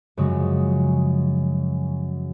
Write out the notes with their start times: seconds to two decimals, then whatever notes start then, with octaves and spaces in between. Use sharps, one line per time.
0.17 F#2 C#3 F3 G#3